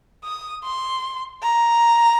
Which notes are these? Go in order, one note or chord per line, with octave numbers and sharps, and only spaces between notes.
D#6
C6
A#5